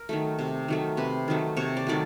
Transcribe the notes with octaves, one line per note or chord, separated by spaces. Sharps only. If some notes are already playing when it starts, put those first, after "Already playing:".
Already playing: A#4
D#3 F#3 A3
C3
D#3 F#3 A3
C3 B4
D#3 F#3 A3
C3 C#5
D5
D#3 F#3 A3 D5